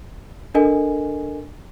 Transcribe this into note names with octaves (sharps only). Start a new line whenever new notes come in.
D4 A4 A#4 D#5 G#5